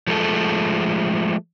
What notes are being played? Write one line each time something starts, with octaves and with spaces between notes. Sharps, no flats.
F3 G#3 A3 A4